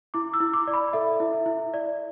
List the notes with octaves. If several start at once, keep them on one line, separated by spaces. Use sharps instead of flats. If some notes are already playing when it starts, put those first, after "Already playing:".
E4 D6
E6
E4
D6
D5
B5
A4 E5
E4
E5
E4
D5